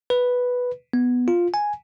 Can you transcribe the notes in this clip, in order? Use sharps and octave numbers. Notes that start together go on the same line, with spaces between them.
B4
B3
F4
G#5